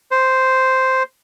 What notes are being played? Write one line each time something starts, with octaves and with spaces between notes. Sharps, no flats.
C5